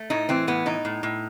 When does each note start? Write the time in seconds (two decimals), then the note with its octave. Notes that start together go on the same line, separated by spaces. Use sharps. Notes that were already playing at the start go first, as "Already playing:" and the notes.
Already playing: A3
0.10 A2 D#4
0.29 E3 C4
0.47 A2 B3
0.66 A2 D#4
0.85 A2
1.03 A2